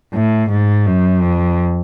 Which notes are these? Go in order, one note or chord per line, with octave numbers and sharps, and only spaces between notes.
A2
G#2
F#2
F2